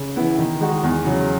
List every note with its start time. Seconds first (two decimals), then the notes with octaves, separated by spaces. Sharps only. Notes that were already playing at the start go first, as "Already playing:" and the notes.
Already playing: C#3
0.16 E3 B3 E4
0.38 D#3
0.61 G#3 D#4 F#4
0.83 E2
1.05 C#3 F#3